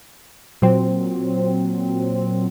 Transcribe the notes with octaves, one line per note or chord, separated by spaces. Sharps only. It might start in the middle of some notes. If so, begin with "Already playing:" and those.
A#2 F#3 C4